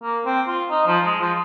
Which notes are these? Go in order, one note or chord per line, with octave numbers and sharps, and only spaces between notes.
A#3
C4
F4
D#4
F3
G#3
F3